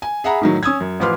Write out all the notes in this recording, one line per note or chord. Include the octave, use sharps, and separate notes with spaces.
G#5
G#4 E5 F#5 A#5 B5
A2 D#3 F#3
C#4 D#6 E6 G#6
F#2
A1 F3 B4 C6 D6 F6